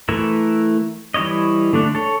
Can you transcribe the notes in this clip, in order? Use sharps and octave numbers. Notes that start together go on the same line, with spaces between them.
E3 A3 E4 A#4 E5
E3 G3 E4 C#5 D#5
D3 A3 D4
A4 C#5